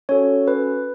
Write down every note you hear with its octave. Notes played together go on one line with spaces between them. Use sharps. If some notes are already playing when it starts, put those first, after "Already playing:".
C#4 F#4 A4 C#5
B4